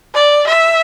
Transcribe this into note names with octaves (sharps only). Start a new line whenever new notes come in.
D5
E5